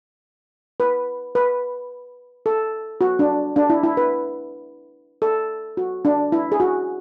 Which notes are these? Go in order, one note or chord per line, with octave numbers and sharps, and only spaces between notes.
B4
B4
A4
F#4
D4
D4
E4
E4
B4
A4
F#4
D4
E4
G#4
F#4